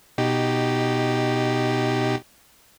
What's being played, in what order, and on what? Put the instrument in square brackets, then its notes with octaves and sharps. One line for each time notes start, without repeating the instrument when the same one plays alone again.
[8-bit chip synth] B2 D#4 G4